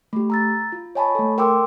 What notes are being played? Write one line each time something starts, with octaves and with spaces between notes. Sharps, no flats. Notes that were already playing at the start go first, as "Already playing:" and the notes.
A3 G4
A#5 E6 A6
F4
C#5 D#5 G#5 A5 B5 C#6
A3 A4
A#4 G5 C6 D6 E6